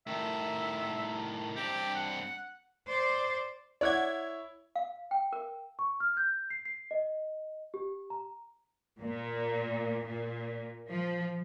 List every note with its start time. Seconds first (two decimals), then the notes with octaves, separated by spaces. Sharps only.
0.07 A2 D#3 E5
1.56 G2 C4 G4
1.95 F#5
2.87 C5 D5
3.81 E4 C#5 D5 F#5 G#6
4.76 F5
5.11 G5
5.33 A#4
5.79 C#6
6.00 F6
6.17 G6
6.50 C7
6.65 C7
6.91 D#5
7.74 G4
8.10 A#5
9.00 A#2
10.05 A#2
10.89 F3